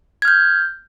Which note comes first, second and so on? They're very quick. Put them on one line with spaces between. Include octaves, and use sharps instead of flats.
G#6 F6 G6